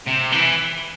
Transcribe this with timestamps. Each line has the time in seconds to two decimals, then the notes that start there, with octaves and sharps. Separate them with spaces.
0.07 C3
0.32 E3